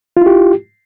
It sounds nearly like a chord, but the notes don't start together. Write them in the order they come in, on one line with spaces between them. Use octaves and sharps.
F4 E4 G4